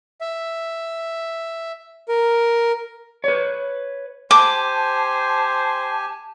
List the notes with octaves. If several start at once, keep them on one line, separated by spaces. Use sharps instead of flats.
E5
A#4
B4 C#5
G4 C5 G#5 A5 D6